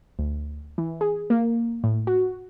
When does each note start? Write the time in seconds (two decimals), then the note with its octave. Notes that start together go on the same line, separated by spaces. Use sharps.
0.19 D2
0.78 E3
1.01 G#4
1.30 A#3
1.84 A2
2.07 F#4